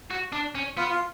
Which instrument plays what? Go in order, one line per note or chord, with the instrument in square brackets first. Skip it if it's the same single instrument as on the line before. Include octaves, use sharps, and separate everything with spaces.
[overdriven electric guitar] F#4
D4
C#4
[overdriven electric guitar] B3 [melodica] F4
[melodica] F4